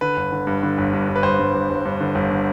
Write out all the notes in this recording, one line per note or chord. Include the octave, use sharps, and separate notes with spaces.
D3 B4
G1
D3
G2
D3
G1
G2
G1
B4
G1 C5
G2
G2
G1
G2
D3
G1
D3